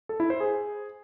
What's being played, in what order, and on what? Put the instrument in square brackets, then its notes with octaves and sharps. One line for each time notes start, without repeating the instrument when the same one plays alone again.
[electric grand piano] A4
E4
C5
G#4